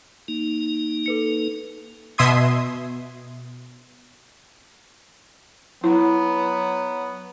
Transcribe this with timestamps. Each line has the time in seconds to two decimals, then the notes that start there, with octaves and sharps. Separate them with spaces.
0.28 A#3 D#4
1.06 A4 B4 C#7
2.18 B2 E5 C6 D#6 G#6
5.84 F#3 B3 E4